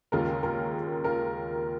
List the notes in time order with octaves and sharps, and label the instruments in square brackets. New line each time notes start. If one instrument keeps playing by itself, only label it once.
[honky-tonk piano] D#2 C#3 G#3 F4 A#4
F4 A#4
F4 A#4